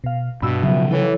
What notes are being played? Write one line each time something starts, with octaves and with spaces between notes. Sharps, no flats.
B2 F5
G2 B2 B5 E6
C#3 F3 F#3 E5
E3 E4 A4 C#5